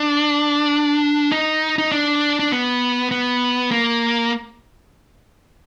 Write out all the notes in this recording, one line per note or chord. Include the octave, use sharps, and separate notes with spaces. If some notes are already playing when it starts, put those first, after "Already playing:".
Already playing: D4
D#4
D#4
D4
D4
B3
B3
A#3